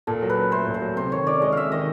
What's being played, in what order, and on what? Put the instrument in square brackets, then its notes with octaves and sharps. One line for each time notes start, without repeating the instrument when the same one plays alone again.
[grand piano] A#2 [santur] A4
[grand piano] F#3
[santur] B4
[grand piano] C#4
[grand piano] A3 [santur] C5
[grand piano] A#2
[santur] C5
[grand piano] F#3
[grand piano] C3 [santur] C5
[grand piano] D#3 [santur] C#5
[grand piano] C#4 [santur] D5
[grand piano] G#3 [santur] D#5
[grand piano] C3 [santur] E5 F5
[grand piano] D#3 [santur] D#5